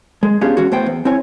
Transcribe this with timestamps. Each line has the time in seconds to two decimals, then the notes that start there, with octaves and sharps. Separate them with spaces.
0.23 G#3
0.41 B3 C#4 D4 F4 G4 G#4
0.57 E3 G#3 C#4 F#4
0.72 A2 B3 C5 G5
0.86 E2
1.05 C4 E4 C#5 G#5